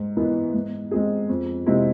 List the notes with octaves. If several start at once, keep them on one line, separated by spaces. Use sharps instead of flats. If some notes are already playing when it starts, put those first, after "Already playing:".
Already playing: G#2
E3 G#3 B3 E4
G#2
G#3 C4 G#4
F2
C3 G#3 C4 E4